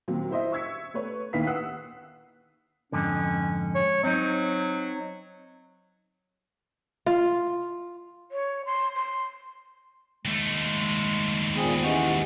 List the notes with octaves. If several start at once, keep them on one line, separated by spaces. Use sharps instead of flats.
D#2 A#2 F#3 C4
E4 C5 D#5 E5
C#6 E6 G#6 B6 C#7
A3 B4 C#5
D#2 D#4 E4 B4 F5 B6
F#5 D#6 E6 F#6 C7
F2 G#2 D3 C#4
C#5
F#3 C4 D#4
F4
C#5
C6
C6
D#2 G#3 A3
A#2 B3 C4 G#4
E3 G#3 C#4 G4 F#5